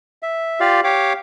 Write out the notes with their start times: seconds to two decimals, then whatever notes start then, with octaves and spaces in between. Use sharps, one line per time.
0.23 E5
0.60 F4 G4 D5 F5
0.84 G4 C#5 F5 D6